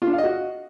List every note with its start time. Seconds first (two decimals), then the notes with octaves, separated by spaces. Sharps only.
0.02 F4
0.07 D4
0.13 F5
0.18 D#5
0.24 F#4